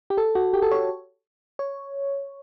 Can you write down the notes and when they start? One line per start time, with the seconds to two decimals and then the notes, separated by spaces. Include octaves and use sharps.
0.10 G4
0.17 A4
0.35 F#4
0.53 G4
0.62 A4
0.71 C#5
1.59 C#5